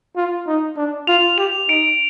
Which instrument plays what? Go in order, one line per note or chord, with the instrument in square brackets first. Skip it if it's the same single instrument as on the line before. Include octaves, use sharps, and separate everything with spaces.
[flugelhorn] F4
D#4
D4
[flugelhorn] F4 [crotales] F7
[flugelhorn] G4 [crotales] F7
[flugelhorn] D#4 [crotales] D7